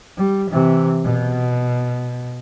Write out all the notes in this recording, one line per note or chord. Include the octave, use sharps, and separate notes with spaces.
G3
C3 E3
B2